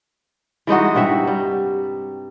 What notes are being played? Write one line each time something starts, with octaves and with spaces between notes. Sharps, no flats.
E3 G#3 D#4 F#4
G2 C3 F#4 E5
G3